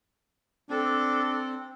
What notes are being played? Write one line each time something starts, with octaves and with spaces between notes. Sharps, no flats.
C4 D4 A4